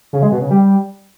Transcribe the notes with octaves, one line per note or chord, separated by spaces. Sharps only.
C#3
G#3
B2
C#3
G3